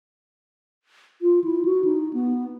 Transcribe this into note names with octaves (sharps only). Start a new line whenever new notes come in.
F4
E4
F#4
D#4
B3